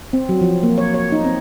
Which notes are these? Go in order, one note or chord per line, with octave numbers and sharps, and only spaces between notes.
C4
F#3
F3
A#3
C#5
C#5
D#4
C4